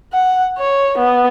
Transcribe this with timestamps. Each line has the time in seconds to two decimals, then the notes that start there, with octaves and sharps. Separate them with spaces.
0.13 F#5
0.58 C#5
0.98 B3